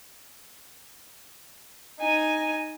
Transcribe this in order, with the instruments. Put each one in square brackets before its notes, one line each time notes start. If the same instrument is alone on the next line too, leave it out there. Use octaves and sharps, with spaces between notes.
[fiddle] D#4 G#5